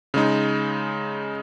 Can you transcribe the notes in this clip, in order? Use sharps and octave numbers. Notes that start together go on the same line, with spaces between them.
C#3 G#3 D#4